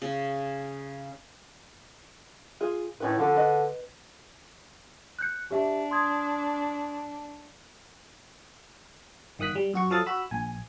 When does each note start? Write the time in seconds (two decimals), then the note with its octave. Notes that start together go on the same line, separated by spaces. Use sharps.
0.02 C#3
2.61 F4 G#4
3.00 A2 D#3 C#4 B4
3.18 D3 F3 C#4 A4
3.37 B4 D#5
5.19 F#6 G6 C#7
5.51 D4 G4 E5
5.91 C6 D#6 G#6
9.39 G1 D#3 D#6 F#6 B6
9.55 G3
9.74 F#2 F#4 C#6
9.90 F3 F#3 A4 F5 D#6 A6
10.06 F#4 B5 E6
10.31 A#1 G#5